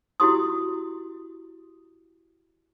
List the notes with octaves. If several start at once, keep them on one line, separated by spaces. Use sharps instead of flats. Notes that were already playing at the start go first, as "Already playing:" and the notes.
E4 F#4 G4 C6 D#6